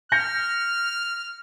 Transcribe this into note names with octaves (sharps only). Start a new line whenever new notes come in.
F6 G6 A#6 C#7